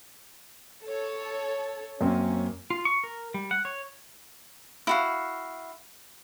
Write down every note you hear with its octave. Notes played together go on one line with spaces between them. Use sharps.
A4 C#5
F#2 A#3 C4 C#4
F4
C#6
A#4
G3
F#5
C#5
E4 F#4 F5